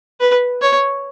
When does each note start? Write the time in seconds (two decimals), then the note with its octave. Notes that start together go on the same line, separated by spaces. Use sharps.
0.20 B4
0.62 C#5